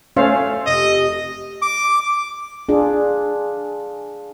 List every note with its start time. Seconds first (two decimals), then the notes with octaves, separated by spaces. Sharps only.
0.16 A3 C#4 A4 C5 F5
0.66 F1 D#5
1.62 D6
2.69 D4 F4 G#4